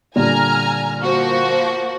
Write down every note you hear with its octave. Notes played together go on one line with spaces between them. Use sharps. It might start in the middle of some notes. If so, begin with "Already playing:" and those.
A#2 D3 G3 G#5 A#5 F6
F3 A#3 F#4